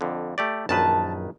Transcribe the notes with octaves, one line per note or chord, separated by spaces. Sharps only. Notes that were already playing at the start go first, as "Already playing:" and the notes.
F2 D3
A3 G4 D5
A#1 F#2 D#3 B4 A5